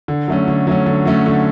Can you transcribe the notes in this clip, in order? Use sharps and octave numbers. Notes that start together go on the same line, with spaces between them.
D3
F#3 A3 C#4
D3
F#3 A3 C#4
D3
F#3 A3 C#4
D3